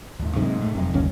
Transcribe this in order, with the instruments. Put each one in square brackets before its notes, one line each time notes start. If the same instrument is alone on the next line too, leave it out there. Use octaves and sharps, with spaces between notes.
[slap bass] D#2 G#2
[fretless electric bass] G#2 [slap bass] C3 F#3 A#3
[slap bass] A2 A3
[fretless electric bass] F1 [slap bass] C3 F#3 G#3
[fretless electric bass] G1 D#2 C#4